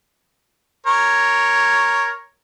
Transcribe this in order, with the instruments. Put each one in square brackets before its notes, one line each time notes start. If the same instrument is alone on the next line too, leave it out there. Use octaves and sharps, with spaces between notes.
[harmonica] A#4 C#5